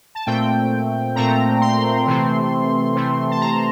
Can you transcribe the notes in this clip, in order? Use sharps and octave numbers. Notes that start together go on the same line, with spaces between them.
A5
A#2 A3 C4 G5
A#2 A3 C4 A#5
C6
C3 E3 A3 C4
C3 E3 A3 C4
A5
A#5